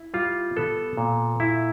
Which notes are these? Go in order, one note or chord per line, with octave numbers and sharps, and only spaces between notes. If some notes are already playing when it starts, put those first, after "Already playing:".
Already playing: E4
G3 F4
B3 A4
A#2
E4